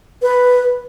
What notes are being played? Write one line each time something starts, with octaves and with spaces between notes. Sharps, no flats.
B4